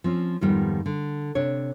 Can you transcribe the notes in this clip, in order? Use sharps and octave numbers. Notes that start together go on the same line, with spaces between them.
F3 C4 C#4
F2 G#2 D#3 F3 G3 B3
D3
C3 D4 C#5